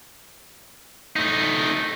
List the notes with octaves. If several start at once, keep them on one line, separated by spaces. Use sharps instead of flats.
A3 D#4